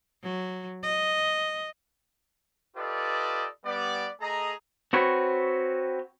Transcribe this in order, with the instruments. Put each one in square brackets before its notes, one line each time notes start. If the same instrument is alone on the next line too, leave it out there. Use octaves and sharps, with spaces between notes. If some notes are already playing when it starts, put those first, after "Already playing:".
[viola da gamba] F#3
D#5
[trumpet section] F4 G4 A4 B4 D5 D#5
G3 B3 D5
A3 G#4 D#5 A#5
[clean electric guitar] C4 F#4 B4 C#5